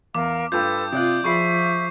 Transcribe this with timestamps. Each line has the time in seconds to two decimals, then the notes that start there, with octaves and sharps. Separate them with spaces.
0.15 E2 A#4 F5 D6
0.52 G2 F4 A4 B4 G6
0.92 C3 F4 D5 F5 D#6 F#6
1.24 F3 F4 G#4 E5 B5 C#6 C7